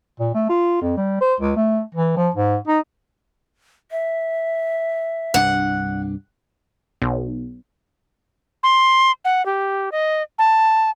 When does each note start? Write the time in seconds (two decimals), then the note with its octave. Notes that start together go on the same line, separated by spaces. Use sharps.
0.20 A#2
0.34 A3
0.50 F4
0.82 F2
0.97 G3
1.21 C5
1.40 C#2
1.56 A3
1.95 E3
2.17 F3
2.35 G#2
2.68 D#4
3.91 E5
5.34 C2 G2 D4 F#5
7.02 B1
8.63 C6
9.25 F#5
9.46 G4
9.92 D#5
10.39 A5